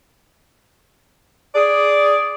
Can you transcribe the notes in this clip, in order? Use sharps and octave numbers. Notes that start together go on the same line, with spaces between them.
G#4 D5